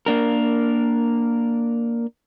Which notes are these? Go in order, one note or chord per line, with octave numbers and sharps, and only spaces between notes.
A#3 D4 A#4